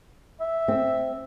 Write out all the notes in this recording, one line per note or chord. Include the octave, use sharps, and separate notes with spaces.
E5
C4